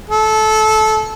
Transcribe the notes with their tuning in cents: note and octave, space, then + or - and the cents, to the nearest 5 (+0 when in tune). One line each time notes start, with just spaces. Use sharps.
A4 -20